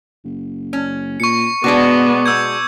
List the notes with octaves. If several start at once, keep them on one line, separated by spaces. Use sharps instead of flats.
F#1
C#4
A#2 C#6 C#7
B2 G#3 B3 D4 F#4 D6
E6 G6 G#6